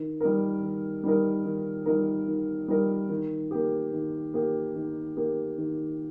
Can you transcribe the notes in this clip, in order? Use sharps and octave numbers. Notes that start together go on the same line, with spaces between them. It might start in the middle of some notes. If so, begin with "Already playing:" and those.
Already playing: D#3
G3 D#4 A#4
D#3
G3 D#4 A#4
D#3
G3 D#4 A#4
D#3
G3 D#4 A#4
D#3
A#3 G4
D#3
A#3 G4
D#3
A#3 G4
D#3